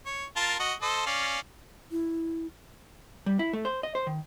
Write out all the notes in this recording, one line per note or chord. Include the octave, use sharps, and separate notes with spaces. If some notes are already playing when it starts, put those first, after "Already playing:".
C#5
F4 A#4 A5
F#4 D#5
A4 C5 D#5
C#4 D5 F5
E4
G3
E4
A3
C5
D#5
C5
D#3